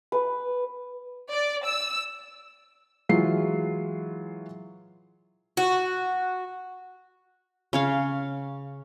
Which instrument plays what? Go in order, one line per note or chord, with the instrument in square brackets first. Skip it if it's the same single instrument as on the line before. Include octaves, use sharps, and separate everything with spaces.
[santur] B4
[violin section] D5
E6
[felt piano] E3 F#3 G#3 F4 C7
[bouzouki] F#4
[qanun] C#3 C#5 F5